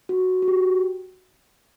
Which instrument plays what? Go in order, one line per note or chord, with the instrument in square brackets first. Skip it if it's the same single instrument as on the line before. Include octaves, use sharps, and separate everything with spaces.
[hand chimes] F#4
F#4
G4